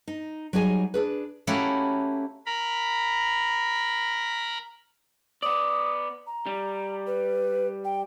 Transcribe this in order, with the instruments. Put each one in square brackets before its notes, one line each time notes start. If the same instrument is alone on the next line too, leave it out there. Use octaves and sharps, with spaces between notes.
[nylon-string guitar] D#4
F#3 G3 D#4 G#4 G#5
D4 G#4 B4
[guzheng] A3 A#3 C#4 E4 F#4 G4
[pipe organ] A#4 A#5 B5
[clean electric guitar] B3 D5 [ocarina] D#6
[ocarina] A#5
[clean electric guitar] G3
[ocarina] B4
G5